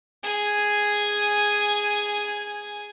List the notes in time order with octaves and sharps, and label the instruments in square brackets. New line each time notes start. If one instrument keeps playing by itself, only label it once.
[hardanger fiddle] G#4 G#5